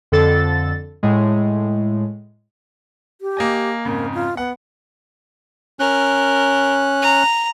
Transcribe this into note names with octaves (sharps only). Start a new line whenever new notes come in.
F2 D3 A4 A6
A2 G#3
G4
A#3 D#5 G#5
F2 G#2 C#3 A#3
F4
B3 F#5
C#4 A#4 F#6
A#5